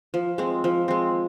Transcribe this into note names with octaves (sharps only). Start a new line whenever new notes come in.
F3
G#3 C4
F3
G#3 C4